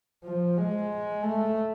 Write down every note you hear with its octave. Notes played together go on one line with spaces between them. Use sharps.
F3
G#3
A3